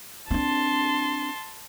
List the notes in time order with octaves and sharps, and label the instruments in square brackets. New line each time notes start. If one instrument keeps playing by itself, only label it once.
[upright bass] C4 D4 [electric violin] A5 C6